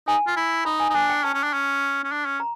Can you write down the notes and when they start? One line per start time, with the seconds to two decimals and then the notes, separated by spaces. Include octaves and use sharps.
0.07 D#4 G#5
0.27 F4
0.36 E4
0.65 D#4 B5
0.80 G#5
0.90 D#4
0.94 D4 G#5
1.10 G5
1.24 C#4 A5
1.34 C#4
1.43 D4
1.53 C#4
2.04 C#4
2.11 D4
2.26 C#4
2.40 A#5